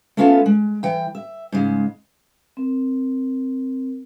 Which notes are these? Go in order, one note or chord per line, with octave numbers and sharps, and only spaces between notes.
A3 B3 C#4 F4 G4 A4
G#3
E3 G5
E5
G#2 C#3 G#3
C4 A#4